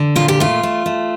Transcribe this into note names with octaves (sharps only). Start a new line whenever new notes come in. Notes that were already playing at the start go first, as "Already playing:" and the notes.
Already playing: D3
A#2 F4
G4
A3 F4
A3
A3